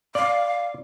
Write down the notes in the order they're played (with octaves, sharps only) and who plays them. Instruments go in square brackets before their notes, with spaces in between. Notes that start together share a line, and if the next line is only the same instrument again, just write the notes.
[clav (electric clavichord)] D5 [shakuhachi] F5